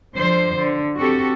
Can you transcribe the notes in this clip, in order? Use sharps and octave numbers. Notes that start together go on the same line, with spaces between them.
D3 F3 C5
D3
C4 F#4 G4 A4